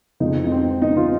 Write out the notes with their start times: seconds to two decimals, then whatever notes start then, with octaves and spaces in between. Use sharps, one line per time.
0.20 F2 F3 G#3 D#4
0.47 D#4
0.52 C4
0.82 D#4
0.97 F4